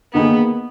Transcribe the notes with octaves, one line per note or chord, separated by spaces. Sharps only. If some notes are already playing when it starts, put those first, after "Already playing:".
D#3 A#3 B3 D#4 G#4